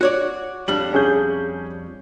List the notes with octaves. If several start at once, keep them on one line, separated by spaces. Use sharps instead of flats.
F#4 C#5 D5
F2 G3 D4 F#7
C#4 G#4 G6